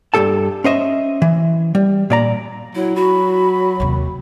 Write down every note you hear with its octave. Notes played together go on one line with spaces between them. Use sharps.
G2 G3 G4 A4 A5
C#4 C5 D#5 E5
E3
G3
A#2 D5 A#5
F#3 E4
F#4 B5
D#2 C3